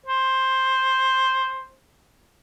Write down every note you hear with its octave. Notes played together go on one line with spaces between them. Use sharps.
C5